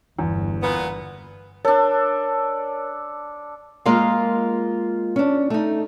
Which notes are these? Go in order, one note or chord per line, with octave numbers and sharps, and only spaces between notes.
G1 E2
A#2 B3
D4 A4 A#4 C#5
G#3 A#3 F4 G#4 A#4 F5
C#4 D4
A3 D#4